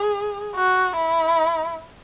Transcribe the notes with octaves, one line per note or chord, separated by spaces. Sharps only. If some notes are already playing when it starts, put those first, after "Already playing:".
Already playing: G#4
F#4
E4